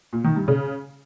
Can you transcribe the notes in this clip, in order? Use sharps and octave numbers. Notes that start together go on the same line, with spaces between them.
A#2
D#3
G2
C#3